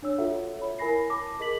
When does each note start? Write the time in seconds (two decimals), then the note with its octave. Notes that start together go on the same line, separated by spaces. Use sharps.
0.02 D4 C#5 E6
0.18 F4 F#4 A4 C#5 E5 F#5
0.59 C#5 B5
0.79 E4 A#4 G#5 B5 A#6 C7
1.10 A5 D6 A#6
1.39 G#4 A#4 D#5 D6 B6 F#7